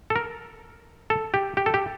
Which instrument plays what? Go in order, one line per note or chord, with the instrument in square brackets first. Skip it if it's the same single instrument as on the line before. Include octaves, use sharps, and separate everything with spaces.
[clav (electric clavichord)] A4
A#4
A4
G4
G4
A4
G4